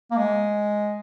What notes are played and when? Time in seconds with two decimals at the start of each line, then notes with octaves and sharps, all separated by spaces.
0.11 A#3
0.17 G#3